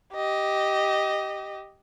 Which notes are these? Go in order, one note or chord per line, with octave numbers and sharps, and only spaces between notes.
G4 D#5